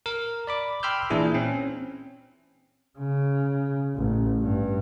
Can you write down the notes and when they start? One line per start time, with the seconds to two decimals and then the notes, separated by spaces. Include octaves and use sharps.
0.06 A#4
0.47 D5 B5 D6
0.83 G5 B5 C6 E6 F6 G6
1.10 A#2 E3 D4 E4 G#4
1.34 C4 C#4
2.98 C#3
3.95 A1
4.39 G2